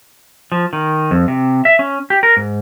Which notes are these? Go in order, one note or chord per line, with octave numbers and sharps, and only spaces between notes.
F3
D#3
F2
C3
E5
C#4
G4
A#4
G#2